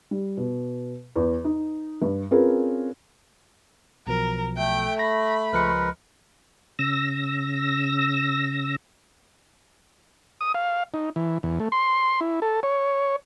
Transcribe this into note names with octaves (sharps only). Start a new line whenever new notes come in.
G3
B2
E2 E3
D#4
G2
C4 C#4 F4 G#4 A#4 B4
B1 B2 F3 A#4
A3 G5
B5 A#6
C#2 F3 G#3 A#4 B4 C#7
C#3 E6 A#6
D#6
F5
D#4
E3
E2
A3
C6
E4
A4
C#5